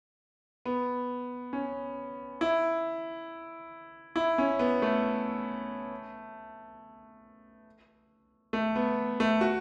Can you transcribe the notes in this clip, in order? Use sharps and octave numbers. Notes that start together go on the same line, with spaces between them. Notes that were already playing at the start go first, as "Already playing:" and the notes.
B3
C#4
E4
E4
C#4
B3
A3
A3
B3
A3
F#4